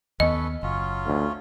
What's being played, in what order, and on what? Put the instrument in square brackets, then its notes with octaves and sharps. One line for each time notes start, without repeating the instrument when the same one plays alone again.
[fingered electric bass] D#2 B3 [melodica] C#4 A4 B4 [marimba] D#5
[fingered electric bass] F#1 [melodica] F#3 C#4 F4
[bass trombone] D2